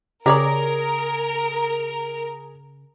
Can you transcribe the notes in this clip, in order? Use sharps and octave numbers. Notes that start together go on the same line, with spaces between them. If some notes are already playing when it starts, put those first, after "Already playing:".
C#3 G4 G#4 A#4 C#5 D5 A#5